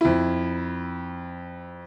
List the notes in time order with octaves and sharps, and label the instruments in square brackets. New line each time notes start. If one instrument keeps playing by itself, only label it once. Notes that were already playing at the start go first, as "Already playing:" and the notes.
[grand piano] F2 E4